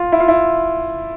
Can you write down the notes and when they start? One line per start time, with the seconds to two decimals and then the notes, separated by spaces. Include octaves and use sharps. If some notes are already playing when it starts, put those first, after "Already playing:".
Already playing: F4
0.12 E4
0.20 F4
0.28 E4